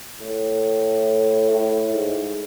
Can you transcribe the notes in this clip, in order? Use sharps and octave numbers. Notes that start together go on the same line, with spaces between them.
A2
A2
G#2